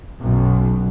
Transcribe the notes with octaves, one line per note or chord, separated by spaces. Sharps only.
B1 F#2